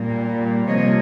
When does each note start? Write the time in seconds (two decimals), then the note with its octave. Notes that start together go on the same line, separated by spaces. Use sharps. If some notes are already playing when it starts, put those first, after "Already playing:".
Already playing: A#2 G3 A#3
0.68 C3 F3 A#3 C#5 D#5